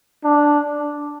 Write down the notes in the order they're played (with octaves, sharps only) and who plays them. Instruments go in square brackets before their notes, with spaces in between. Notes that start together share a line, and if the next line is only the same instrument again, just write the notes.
[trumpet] D4